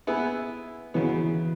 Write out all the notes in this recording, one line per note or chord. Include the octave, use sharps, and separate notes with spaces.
B3 E4 G#4 B4
C#3 E3 F#3 B3